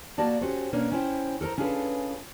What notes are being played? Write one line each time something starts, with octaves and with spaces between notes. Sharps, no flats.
A#3 F#4 D5 A5
C#4 F#4 G4 A4 C5
B2 A#3 C#4 D4
C#4 E4 C5 G5
A4 A#4 C5 A#5
C#4 D4 F4 G#4 A4 B4